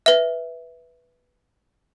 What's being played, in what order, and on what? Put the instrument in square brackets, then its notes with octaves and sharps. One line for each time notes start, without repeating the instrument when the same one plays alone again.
[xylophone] B4 E5